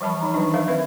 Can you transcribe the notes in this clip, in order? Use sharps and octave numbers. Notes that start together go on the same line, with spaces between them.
E3 F3 G3 A5 B5
F3 D#4 A#5
D#3 E3 F#3 G3 D4 D#4
A#4 C5 E5 F5
D#3 C4 B4 E5 F5